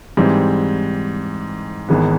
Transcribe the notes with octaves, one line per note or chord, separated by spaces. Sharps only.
G#2 E3 G3 C4
G#1 G#2 E3 G#3 B3